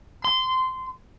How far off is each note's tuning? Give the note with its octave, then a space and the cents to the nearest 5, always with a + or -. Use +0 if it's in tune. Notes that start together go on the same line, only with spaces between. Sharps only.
C6 -20